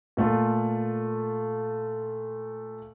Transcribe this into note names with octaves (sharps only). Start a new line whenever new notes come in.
A#2 A3 F4